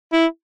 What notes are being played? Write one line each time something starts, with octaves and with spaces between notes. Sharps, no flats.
E4